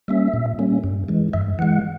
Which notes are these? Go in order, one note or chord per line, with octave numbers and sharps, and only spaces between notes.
G3 A#3 C#4 E5
A#2
G3 A#3 C#4
G2
E3 G#3
G2 E5
E3 G#3 F#5